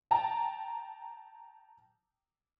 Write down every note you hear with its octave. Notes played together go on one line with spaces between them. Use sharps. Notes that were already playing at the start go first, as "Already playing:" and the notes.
G5 A5 A#5